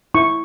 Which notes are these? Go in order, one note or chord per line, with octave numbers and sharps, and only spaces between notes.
E4 C#6